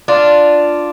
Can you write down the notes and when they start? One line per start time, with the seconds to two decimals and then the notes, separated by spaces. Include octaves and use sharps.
0.08 D4 F4